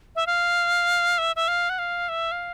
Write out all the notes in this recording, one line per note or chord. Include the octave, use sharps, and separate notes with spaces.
E5
F5
E5
E5
F5
F#5
F5
E5
F5